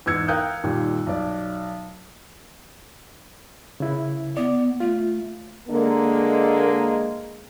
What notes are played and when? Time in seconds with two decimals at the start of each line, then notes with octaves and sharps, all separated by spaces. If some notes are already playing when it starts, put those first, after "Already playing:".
0.06 E2 G#2 E6 G#6 C#7
0.28 A#4 F5 G5 D#6 F#6 G6
0.64 D#2 A#2 D#3 G3
1.06 B1 D5
3.80 C#3 E4
4.37 B3 D5
4.80 A3 F4
5.69 D3 G#3 A#3